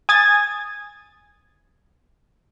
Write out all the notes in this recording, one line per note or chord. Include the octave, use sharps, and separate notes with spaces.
G#5 D#6 G#6 A6